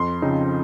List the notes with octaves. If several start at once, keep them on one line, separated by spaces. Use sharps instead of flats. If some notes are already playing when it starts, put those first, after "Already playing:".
Already playing: F2 C6
C#3 F3 C4 D#4